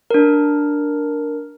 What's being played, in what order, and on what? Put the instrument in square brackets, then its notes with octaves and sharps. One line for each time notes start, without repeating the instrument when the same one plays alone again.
[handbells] D4 A#4